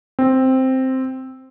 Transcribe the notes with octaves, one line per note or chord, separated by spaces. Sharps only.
C4